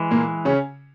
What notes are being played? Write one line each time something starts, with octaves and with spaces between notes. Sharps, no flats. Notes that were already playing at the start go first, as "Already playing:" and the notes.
Already playing: E3 G#3
A#2 A#3
C#3 C#4